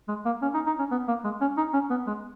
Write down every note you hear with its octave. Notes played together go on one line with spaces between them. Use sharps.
G#3
A#3
C#4
D#4
D#4
C#4
B3
A#3
G#3
C#4
D#4
C#4
B3
G#3